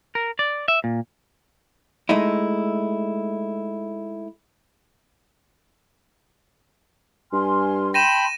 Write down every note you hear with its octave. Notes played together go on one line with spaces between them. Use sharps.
A#4
D5
E5
A#2
G#3 A3 D#4 E4
G2 G#5 C6 F6
G5 A5 B5 C6 A#6 D#7 E7